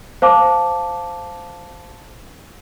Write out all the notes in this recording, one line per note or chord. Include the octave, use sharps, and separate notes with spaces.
C5 F5 A5 D6